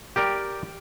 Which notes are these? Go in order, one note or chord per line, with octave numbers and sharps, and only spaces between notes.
G4 A#4 D5 G5